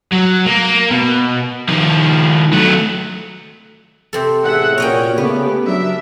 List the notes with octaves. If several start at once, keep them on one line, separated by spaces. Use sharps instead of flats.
F#3
A#3
B2
D#3 F3
F#3 A3
C3 C4 A4
A1 G#4 E5 F#5
A#2 C#4 F#4 A#4 C#5 D#5 G5
C#3 A3 B3 G4 B4
F#3 D4 A#4 E5